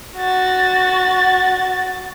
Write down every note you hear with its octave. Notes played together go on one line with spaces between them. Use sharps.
F#4 A6